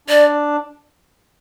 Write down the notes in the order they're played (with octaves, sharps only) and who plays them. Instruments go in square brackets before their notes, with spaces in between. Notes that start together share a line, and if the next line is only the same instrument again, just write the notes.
[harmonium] D4 [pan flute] D5